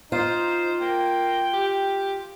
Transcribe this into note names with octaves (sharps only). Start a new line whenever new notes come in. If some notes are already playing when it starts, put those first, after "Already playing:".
D#4 F4 C5
A#3 G5
G4